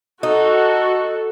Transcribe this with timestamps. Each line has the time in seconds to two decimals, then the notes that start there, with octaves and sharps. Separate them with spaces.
0.23 D#4 F#4 A4